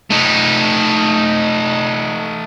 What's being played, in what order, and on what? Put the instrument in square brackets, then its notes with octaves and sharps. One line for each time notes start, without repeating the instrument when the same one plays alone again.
[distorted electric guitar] A3 D#4